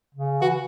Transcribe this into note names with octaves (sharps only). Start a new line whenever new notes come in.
C#3
E3 F#4